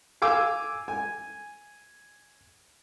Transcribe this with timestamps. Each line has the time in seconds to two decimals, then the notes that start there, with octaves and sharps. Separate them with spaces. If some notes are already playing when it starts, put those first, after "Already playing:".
0.22 F5 G#5 D6 E6
0.88 G#5